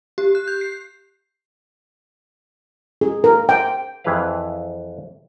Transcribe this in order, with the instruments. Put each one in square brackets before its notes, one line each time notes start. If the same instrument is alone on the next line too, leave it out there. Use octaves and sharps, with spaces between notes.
[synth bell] G4
F#6
G6
C7
[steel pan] G#4
A#4
G5
[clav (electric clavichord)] F2 E3 E4 G#4 B4 F5